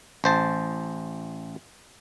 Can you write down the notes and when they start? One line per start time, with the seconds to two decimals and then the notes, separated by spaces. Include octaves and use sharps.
0.24 A1 C5 A5